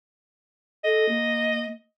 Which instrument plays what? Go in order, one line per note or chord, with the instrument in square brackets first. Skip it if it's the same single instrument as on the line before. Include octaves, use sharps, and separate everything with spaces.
[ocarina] A4 [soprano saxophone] D#5
[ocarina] A#3